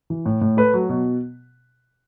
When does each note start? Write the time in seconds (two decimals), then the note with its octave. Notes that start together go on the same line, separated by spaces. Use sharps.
0.10 E3
0.26 A2
0.41 A2
0.57 A3 B4
0.74 F#3
0.89 B2